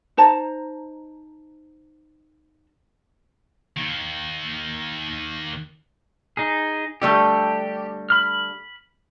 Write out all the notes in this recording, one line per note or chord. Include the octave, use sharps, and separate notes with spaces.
D#4 C5 A5 A#5
D#2 D#3
D#4 G#4
D3 G3 A3 G4
B5 F6